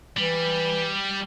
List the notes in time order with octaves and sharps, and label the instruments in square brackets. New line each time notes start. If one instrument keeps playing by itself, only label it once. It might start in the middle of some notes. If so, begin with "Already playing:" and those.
[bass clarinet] E3 [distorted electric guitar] G3